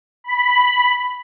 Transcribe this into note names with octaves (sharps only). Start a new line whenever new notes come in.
B5